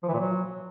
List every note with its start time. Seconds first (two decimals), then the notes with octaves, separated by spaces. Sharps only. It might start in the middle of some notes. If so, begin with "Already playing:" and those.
0.03 F3
0.08 E3
0.14 A#2
0.19 F#3